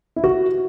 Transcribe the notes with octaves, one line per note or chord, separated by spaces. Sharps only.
E4
F#4